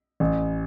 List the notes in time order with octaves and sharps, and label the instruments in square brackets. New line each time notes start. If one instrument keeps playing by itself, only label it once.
[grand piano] A1